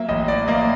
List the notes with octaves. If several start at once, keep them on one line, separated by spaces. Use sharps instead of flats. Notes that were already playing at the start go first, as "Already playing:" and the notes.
Already playing: F#3 A#3 E5
A1 D#5
D5
A#3 D#5